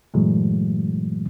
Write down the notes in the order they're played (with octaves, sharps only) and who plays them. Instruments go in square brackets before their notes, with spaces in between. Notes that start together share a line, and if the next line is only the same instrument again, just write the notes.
[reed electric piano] G2 A#2 E3 F#3 G#3 A3